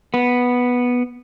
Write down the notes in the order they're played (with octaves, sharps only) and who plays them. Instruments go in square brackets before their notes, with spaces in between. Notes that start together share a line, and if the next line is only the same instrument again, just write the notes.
[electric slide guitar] B3